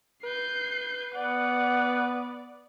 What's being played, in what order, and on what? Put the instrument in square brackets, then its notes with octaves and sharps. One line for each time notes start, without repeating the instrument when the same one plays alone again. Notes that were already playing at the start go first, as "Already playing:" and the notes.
[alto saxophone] B4 [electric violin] G6 C7
[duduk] B3 [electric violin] D5 [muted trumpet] F#5